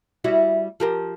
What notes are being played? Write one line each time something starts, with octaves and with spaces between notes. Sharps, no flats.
G3 E4 F#4
F3 G4 A#4